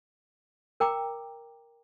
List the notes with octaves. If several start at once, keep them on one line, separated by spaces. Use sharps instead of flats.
A#4 G5 A#5 D6